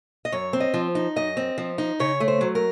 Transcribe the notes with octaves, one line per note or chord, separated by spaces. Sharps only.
D#5
F#2 C#5
C4
D#5
F3
D#4
F#2 D#5
C4
F3
D#4
C#3 C#5
A3
C5
F#3
A#4